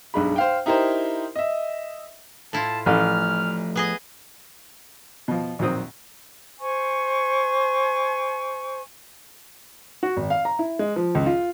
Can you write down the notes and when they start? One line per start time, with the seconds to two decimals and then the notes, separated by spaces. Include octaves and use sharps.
0.14 B1 G2 G#3 B5
0.36 C5 F5 G5
0.66 D#4 E4 G4 A#4 C5 C6
1.36 D#5 E5
2.53 A2 E4 F4 A5
2.86 A1 F3 A3 F6
3.76 B3 G#4 D#5
5.28 B2 F3
5.59 A#1 D#3 F#3 C4 D#6
6.60 C5 G#5 C#6
10.03 F#4
10.17 G#1
10.30 F5
10.45 A#5
10.59 E4
10.79 G#3
10.96 F3
11.15 C#2
11.26 F4